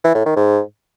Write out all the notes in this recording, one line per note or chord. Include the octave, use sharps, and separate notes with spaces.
E3
A2
D#3
G#2